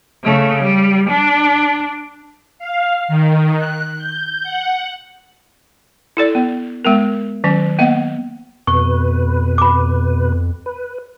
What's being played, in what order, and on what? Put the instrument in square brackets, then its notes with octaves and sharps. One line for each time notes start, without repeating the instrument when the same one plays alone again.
[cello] C#3 A3
G3
D4
[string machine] F5
D#3
F#6
G6
F#5
[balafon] E4 A4 D5
B3
G#3 B3 A#4
D#3 F#3 C#4 G#5
A#3 B3 D#5 F5
[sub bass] F2 [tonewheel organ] B2 B4 [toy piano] C#6
[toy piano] B5 D6
[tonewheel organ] B4